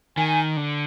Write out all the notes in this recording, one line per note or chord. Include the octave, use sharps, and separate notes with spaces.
D#3 G#5
D3